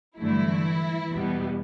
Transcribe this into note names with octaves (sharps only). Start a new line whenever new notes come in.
G2 D3 E3 F#3 A3 E4
E2 B2 G3 B3